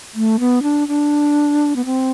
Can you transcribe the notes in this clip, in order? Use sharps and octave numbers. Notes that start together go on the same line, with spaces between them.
A3
B3
D4
D4
B3
C4